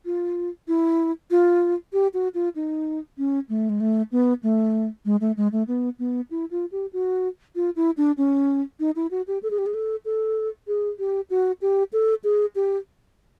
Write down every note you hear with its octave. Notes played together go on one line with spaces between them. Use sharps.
F4
E4
F4
G4
F#4
F4
D#4
C#4
A3
G#3
A3
B3
A3
G#3
A3
G#3
A3
B3
B3
E4
F4
G4
F#4
F4
E4
D4
C#4
D#4
E4
F#4
G4
A4
G#4
G4
G#4
A4
A4
G#4
G4
F#4
G4
A4
G#4
G4